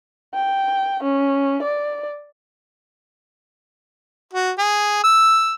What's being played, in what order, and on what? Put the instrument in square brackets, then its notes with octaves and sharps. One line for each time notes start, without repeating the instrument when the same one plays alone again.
[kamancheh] G5
C#4
D5
[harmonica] F#4
G#4
E6